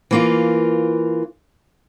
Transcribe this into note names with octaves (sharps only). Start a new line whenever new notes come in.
E3 A#3 F4